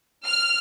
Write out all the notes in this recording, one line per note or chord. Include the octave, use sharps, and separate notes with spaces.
F6